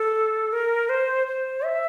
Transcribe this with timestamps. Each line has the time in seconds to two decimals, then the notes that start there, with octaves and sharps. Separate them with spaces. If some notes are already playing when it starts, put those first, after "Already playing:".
Already playing: A4
0.52 A#4
0.89 C5
1.27 C5
1.64 E5